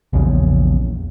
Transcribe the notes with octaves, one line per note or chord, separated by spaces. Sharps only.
A#1 E2 C#3